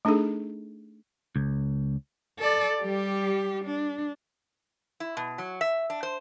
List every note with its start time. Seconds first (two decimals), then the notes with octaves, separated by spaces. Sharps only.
0.05 A3 D4 D#4 G#4 A4
1.36 C#2
2.39 A4 D5
2.81 G3 G4
3.65 D4
5.00 E4
5.17 B2
5.38 F#3
5.61 E5
5.90 D4
6.03 C5